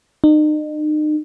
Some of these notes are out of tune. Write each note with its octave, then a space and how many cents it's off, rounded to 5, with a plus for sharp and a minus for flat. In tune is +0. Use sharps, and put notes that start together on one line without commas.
D#4 -35